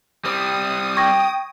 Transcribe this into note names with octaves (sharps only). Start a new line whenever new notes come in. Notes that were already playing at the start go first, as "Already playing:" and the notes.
G3 C4 D#6
G5 C#6 G#6 A#6